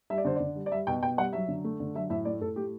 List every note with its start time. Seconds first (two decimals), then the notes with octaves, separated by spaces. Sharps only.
0.10 G3 E5
0.18 D5
0.25 D3 C5
0.36 D3 D5
0.55 G3
0.66 D5
0.72 G3 E5
0.87 B2 G5
1.02 B2 G5
1.17 G3 F#5
1.33 F#3 E5
1.48 D3
1.64 A3
1.80 D3
1.95 F#3 E5
2.10 A2 E5
2.25 A3 D5
2.41 A2 A4
2.56 A3 G4